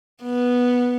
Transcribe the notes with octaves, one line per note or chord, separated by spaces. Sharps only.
B3